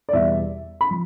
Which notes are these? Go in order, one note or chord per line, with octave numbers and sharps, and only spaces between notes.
D5
E2 B2 G3 B3 E5
B5
F3